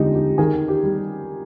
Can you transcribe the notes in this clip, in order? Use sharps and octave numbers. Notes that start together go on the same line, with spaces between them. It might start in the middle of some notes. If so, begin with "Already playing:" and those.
Already playing: F2 D3 G#3 D#4 G4
G4
D#3 G#4
G4
G3